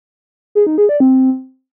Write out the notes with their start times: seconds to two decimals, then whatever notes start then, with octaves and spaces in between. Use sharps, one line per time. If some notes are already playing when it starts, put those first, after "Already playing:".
0.55 G#4
0.67 D#4
0.78 G#4
0.89 D5
1.00 C4